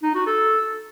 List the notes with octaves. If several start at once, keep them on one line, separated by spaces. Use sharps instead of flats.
D#4
F#4
A4